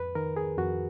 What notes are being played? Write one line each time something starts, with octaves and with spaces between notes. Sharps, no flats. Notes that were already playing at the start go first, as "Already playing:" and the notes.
Already playing: F2 B4
D#3 A#4
G#4
F2 F#4